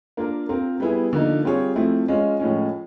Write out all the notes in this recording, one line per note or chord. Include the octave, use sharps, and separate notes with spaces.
A#3 D4 F4 A#4
C4 F4 A#4
G3 B3 E4 G#4
D3 F3 A#3 D#4
G3 C4 F4 G#4 C#5
F3 A3 C4 E4
G#3 C#4 F4
A2 F3 G#3 C#4